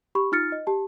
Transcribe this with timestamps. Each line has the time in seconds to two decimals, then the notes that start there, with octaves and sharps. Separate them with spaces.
0.15 G4 B5 C#6
0.32 D#4 F4 F6 A6 C#7
0.52 D#5
0.67 G4 A5